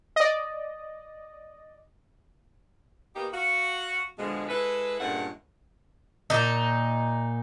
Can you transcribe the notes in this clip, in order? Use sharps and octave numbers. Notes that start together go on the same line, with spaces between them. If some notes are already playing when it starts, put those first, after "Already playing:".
D5 D#5
A#3 B3 D#4 G4
F#4 F5
B2 D3 F3 G#3
G#3 E4 A4 B4
G2 A#2 G#3 A3 C#4 F#5
A#2 D#4